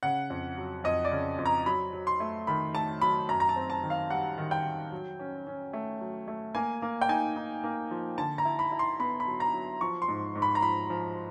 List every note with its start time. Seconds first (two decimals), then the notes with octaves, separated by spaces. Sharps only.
0.03 C#3 F#5
0.30 F2
0.57 F#3
0.84 F2 D#5
1.05 D5
1.12 C#3
1.39 F2
1.46 A#5
1.66 F#3 B5
1.93 F#3
2.07 C6
2.20 A3
2.47 D#3 B5
2.75 A3 A5
3.01 F#3 B5
3.28 F#2 A#5
3.40 A#5
3.49 A5
3.56 C4
3.70 A5
3.83 D#3
3.90 F5
4.10 G3 F#5
4.38 D#3
4.51 G5
4.65 D#3
4.92 F#3
5.19 C#4
5.47 C#4
5.73 A3
6.01 F#3
6.28 A3
6.55 A#3 G#5
6.82 A#3
7.01 G5
7.09 D#4 G#5
7.36 D#4
7.64 A#3
7.91 F3
8.18 D3 A5
8.38 A#5
8.45 E4
8.59 B5
8.72 E4
8.79 C6
8.99 B3 B5
9.20 B5
9.27 F#3
9.40 A#5
9.54 F#3
9.81 F3 C#6
10.02 C6
10.08 G#2
10.35 G#2
10.42 B5
10.55 A#5
10.62 F3 B5
10.90 F3